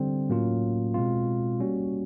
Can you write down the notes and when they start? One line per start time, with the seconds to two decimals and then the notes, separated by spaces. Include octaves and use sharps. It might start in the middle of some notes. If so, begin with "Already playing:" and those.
Already playing: D3 G3 C4
0.29 A2 F#3 A#3 C#4 F4
0.94 B2 G#3 C4 F4
1.60 G3 A#3 C#4 F#4